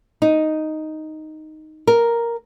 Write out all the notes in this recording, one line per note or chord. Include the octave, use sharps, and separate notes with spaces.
D#4
A#4